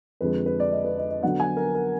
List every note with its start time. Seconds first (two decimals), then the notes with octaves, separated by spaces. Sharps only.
0.21 F2 D3 G#3 B4
0.46 B4
0.60 D5
0.72 D#5
0.84 B4
0.98 D#5
1.10 D#5
1.23 D3 F#3 B3 F#5
1.40 G#5
1.57 A#4
1.75 A#4